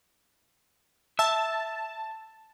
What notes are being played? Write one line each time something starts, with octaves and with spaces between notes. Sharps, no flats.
E5 A5